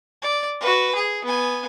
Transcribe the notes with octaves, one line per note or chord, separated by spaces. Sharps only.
D5
F#4 B4
G#4
B3 G#5